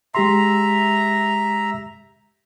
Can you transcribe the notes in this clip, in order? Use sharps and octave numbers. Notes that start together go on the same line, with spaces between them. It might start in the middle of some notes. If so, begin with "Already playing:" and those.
G#3 G4 E5 A#5 C6